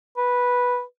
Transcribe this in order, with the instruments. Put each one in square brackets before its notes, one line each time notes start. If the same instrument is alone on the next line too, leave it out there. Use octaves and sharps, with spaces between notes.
[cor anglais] B4